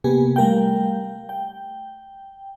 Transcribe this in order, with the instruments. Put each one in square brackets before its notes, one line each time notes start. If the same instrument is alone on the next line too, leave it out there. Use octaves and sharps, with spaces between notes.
[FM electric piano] C3 A#3 B3 G4 G#5
G3 A3 A#4 F5 G5
G5